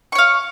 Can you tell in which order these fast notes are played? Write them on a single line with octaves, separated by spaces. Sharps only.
C#6 C#5 F5